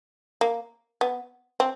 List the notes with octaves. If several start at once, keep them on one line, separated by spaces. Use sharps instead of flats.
A#3
B3
C4